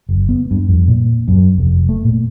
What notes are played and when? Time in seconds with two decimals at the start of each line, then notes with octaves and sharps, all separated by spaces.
0.09 F#1
0.29 B3
0.51 G2
0.69 F2
0.88 A#2
1.28 F#2
1.58 F1
1.89 A3
2.05 A#2